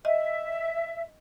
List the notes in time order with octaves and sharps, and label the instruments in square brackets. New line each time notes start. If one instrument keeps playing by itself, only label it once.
[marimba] D#5 [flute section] E5